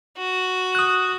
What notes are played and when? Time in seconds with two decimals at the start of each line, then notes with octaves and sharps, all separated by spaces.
0.17 F#4
0.75 D#6 F#6